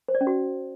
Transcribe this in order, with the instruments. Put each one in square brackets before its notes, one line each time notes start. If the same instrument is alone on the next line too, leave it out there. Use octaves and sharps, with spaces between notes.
[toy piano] C5
D5
C#4
F#4